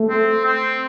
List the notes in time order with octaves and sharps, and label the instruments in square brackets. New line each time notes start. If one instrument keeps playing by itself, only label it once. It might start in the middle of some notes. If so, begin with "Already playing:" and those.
Already playing: [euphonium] A3
[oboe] C4
C4